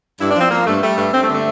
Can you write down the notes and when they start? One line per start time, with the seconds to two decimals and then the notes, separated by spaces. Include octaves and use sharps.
0.20 G2 E4
0.31 F3 D4
0.41 C4
0.51 F3 A#3
0.66 G2 A3
0.83 G3 A3
0.98 G2 A3
1.14 G2 C4
1.23 A3
1.29 D3
1.34 A3